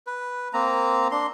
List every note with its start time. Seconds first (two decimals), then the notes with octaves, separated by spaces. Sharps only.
0.07 B4
0.54 A#3 C4 A#5
1.11 D4 C6